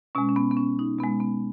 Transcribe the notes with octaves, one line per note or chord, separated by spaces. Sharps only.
B2 G#3 C#4
C#4
B3
B3
C#4
D#4
B2 G#3 B3
B3